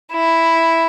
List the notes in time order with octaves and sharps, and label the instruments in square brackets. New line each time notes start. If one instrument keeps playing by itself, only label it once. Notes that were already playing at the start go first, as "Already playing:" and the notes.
[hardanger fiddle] E4